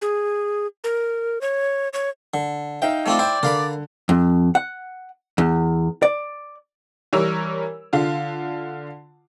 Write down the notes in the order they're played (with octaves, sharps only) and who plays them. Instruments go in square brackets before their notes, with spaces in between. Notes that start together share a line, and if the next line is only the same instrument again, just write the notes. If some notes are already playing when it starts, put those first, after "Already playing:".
[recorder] G#4
A#4
C#5
C#5
[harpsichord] D3
[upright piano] D#4 E5 F5 [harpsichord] G5
[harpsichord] A3 C4 F4 [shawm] D5
[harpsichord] E4 C5 [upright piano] G5
[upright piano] D3 [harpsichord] A#4 F5 B5
[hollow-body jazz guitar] F2
F#5
E2
D5
[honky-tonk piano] E3 G3 A#4 C#5 E6 F7
D3 F4